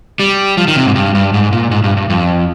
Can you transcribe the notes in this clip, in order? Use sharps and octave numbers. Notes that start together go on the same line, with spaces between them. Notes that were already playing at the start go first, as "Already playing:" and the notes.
G3
F3
D#3
C3
G#2
G2
G2
G#2
A#2
G#2
G2
G2
F2